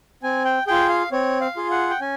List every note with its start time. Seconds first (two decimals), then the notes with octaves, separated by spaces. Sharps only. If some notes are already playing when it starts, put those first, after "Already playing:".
0.23 C4 G#5
0.45 G5
0.67 F4 G#4 G5
0.89 F5
1.12 C4 C#5
1.41 F5
1.56 F4 G#4
1.71 F#5
1.90 G5
2.01 C#4 G#5